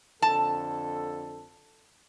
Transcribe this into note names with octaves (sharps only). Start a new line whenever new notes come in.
F2 D3 A4 A5